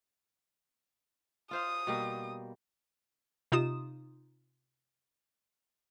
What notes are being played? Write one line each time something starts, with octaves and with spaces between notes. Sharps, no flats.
F4 C5 F5 D#6
B2 G3 A#3
C3 D#4 F4 D#6 E7